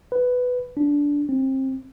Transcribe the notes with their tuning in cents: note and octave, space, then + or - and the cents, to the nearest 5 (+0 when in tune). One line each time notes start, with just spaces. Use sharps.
B4 +10
D4 -15
C4 +25